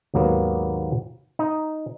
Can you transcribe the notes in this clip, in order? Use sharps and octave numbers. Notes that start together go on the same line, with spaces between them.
D#2 G#2 F#3 A#3 B3
D#4